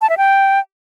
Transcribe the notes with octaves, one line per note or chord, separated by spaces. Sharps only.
A5
E5
G5